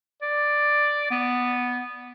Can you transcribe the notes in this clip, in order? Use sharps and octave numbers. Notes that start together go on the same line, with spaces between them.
D5
B3